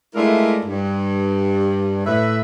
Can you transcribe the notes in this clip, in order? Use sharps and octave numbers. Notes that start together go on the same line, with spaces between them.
G#3 A3 D4 E4 F4 A#4
G2
A2 B4 E5